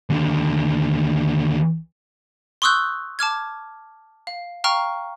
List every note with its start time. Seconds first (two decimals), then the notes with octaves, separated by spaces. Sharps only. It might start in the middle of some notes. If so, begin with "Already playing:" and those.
0.10 D#2 D3
2.62 C6 C#6 D#6 E6 F#6 G6
3.19 A5 D6 F6 G#6
4.27 F5
4.64 F5 G5 A#5 C#6 F6